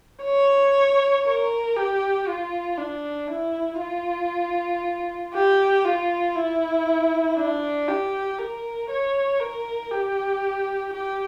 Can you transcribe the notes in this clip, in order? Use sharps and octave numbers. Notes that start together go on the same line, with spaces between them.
C#5
A#4
G4
F4
D4
E4
F4
G4
F4
E4
D4
G4
A#4
C#5
A#4
G4
G4